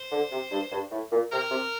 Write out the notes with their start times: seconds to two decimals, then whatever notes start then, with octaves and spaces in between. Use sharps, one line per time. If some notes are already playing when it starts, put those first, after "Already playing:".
Already playing: C5
0.12 D3
0.31 C3
0.51 G2
0.72 G2
0.91 A2
1.12 A#2
1.31 C3 A#4
1.51 C3